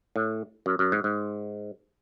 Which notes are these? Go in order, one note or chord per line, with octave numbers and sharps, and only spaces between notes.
A2
F#2
F#2
G#2
G#2